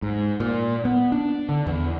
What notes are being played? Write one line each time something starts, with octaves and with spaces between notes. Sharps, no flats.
G#2
A#2
B3
D4
D3
E2